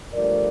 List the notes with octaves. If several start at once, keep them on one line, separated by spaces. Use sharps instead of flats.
G2 F3 A3 A#4 D5